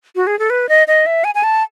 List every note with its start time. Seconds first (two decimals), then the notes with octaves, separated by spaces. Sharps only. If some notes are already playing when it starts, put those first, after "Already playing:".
0.16 F#4
0.27 G#4
0.39 A4
0.50 B4
0.69 D#5
0.88 D#5
1.06 E5
1.24 G#5
1.35 G#5
1.44 A5